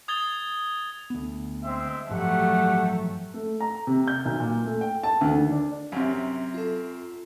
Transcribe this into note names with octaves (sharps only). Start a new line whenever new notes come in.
D#6 G#6 A6 G7
D2 B3
G#3 C4 E5
A1 G2 F3 F#3 A3 G4 F#5
A3
A#5
C3
G6
B1
A#2
A3
G5
A5
D2
D#3
D4
F#2 C3 F#3
F4 A4